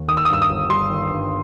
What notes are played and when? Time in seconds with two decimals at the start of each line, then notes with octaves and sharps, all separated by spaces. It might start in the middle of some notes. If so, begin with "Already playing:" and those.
Already playing: D#2
0.08 D#3 D#6
0.17 E6
0.25 D#6
0.29 G2 E6
0.42 D#6
0.50 G1
0.70 G3 C6
0.90 D#3
1.10 G2